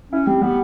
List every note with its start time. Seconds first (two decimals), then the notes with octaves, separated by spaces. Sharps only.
0.12 C#4 E4
0.27 G3 C4
0.42 G3 B3